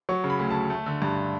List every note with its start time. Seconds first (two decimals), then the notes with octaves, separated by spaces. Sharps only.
0.09 F#3 C#6
0.24 C#3
0.30 B5
0.39 D2
0.50 D2 A5
0.70 A3
0.86 D3
1.02 G2